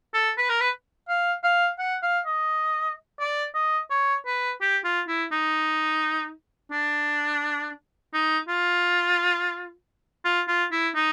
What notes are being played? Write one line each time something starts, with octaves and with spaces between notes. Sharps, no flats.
A4
B4
A#4
B4
F5
F5
F#5
F5
D#5
D5
D#5
C#5
B4
G4
F4
E4
D#4
D4
D#4
F4
F4
F4
E4
D#4